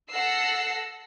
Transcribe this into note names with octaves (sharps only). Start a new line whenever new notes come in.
A4 F#5 E6 A#6 C7